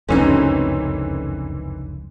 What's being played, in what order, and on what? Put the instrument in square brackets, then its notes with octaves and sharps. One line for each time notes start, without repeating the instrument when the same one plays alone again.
[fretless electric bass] F1 C#2 F#2 [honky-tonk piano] D3 E3 C4 [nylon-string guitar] C#4 D#4